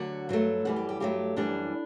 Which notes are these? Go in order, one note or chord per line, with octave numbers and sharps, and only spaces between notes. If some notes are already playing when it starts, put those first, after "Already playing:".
Already playing: D2 D3 F#3 F#4
G2 F#3 A3
F#2 E3 G3 E4
G4
G4
G2 F#3 A3 G4
F#2 E3 G3 D4